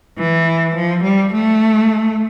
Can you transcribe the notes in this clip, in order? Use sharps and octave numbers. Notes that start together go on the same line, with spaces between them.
E3
F3
G3
A3